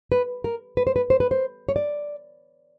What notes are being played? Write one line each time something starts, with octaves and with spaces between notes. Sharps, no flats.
B4
A#4
B4
C5
B4
C5
B4
C5
C#5
D5